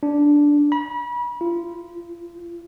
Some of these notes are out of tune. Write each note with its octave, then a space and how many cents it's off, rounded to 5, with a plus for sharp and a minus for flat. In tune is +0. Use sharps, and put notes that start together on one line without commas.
D4 -5
B5 -35
F4 -35